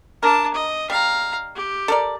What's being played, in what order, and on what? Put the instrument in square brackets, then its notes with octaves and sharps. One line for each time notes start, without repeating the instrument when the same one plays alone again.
[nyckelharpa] D4 A5 [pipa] A#4
[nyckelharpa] D#5
[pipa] G3 [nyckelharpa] F5 A#5
[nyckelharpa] G4
[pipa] A4 A#4 D5